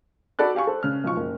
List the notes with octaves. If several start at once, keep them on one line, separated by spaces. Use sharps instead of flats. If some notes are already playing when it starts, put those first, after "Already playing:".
F#4 A4 D5 B5 F#6
G4 F5 G#5 C#6
A4 C5
C#3 F6
B1 F3 C#6
F#1